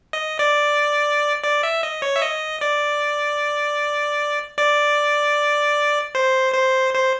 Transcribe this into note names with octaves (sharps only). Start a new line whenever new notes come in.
D#5
D5
D5
E5
D#5
C#5
E5
D#5
D5
D5
C5
C5
C5